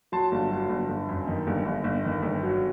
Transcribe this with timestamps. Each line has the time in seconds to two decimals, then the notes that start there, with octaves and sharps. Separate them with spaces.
0.12 F#3 A5 C6
0.32 G1
0.51 F#3
0.69 G1
0.89 G1
1.09 F#2
1.27 D#3
1.47 G1
1.66 G1
1.84 G1
2.05 D#3
2.23 G1
2.43 F#3